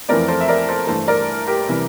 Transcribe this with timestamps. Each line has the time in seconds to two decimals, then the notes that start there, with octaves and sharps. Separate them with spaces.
0.09 F2 E3 A3 C4 A#4 D5
0.28 A4 C5
0.41 E5
0.48 A#4 D5
0.69 A4 C5
0.87 G2 E3 A3 A4 C5
1.08 A#4 D5
1.47 G4 A#4
1.68 C3 E3 G3